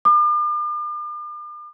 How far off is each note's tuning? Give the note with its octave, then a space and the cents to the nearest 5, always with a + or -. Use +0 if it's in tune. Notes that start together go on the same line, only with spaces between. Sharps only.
D6 +45